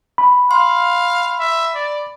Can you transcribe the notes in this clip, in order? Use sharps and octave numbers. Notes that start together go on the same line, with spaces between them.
B5
F5 C6
E5
D5